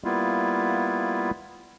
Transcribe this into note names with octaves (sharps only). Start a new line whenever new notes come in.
G3 A#3 B3 E4 F4